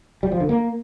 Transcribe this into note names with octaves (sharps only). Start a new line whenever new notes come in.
G3
F3
D3
A#3